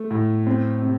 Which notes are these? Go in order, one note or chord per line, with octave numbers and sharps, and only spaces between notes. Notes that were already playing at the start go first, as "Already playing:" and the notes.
Already playing: A3
A2
C4
C3